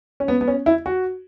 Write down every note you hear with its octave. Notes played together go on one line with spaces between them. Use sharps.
C#4
B3
B3
C#4
E4
F#4